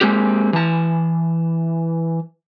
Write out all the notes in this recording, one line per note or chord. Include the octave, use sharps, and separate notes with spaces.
G#3 A#3 C4 G4
E3 A5